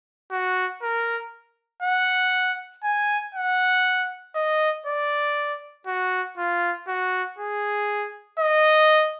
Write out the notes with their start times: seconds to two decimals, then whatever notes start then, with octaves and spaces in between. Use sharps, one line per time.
0.31 F#4
0.83 A#4
1.82 F#5
2.84 G#5
3.35 F#5
4.35 D#5
4.86 D5
5.87 F#4
6.38 F4
6.88 F#4
7.39 G#4
8.39 D#5